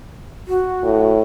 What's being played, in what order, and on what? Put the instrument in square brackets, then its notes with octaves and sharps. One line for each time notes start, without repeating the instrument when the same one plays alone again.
[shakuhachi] F#4
[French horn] A2